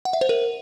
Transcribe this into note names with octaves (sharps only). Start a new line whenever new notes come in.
F#5
E5
C5
A#4